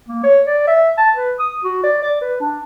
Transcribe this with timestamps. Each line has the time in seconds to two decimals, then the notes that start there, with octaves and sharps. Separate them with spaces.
0.09 A#3
0.24 C#5
0.47 D5
0.67 E5
0.98 A5
1.16 B4
1.39 D#6
1.64 F#4
1.84 D5
2.03 D5
2.21 B4
2.40 D4